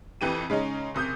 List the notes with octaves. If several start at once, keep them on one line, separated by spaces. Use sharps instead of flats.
F2 E3 G4 D#7
C#3 G#3 C#4 D#4
F#1 C3 D#6 G6